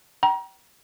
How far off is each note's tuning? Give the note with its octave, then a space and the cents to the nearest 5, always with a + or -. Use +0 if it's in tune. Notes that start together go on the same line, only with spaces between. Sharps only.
G5 -30 A#5 +35